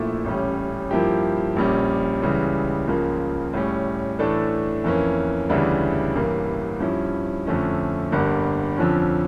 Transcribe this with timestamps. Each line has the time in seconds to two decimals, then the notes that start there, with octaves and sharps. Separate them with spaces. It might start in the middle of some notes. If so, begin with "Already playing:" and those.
Already playing: A#1 A#2 A3 E4 A4
0.25 A1 A2 G3 C#4
0.91 G2 F3 A#3 E4 G4
1.56 A#1 A#2 G3 C#4
2.22 C#2 C#3 E3 G3
2.87 C#2 C#3 F3 A#3
3.53 A2 G3 C#4
4.19 A2 E3 A3 D4 A4
4.84 F2 E3 A#3 C#4
5.49 D2 C#3 E3 G3 D4
6.15 A1 G2 E3 A#3
6.80 G2 F3 C#4 E4
7.46 F2 D3 F3 A3 C#4
8.12 G1 G2 D3 G3 A#3
8.77 F2 D3 F3 C#4